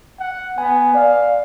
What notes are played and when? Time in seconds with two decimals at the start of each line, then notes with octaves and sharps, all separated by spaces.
0.20 F#5
0.58 B3 G#5
0.94 D5 F5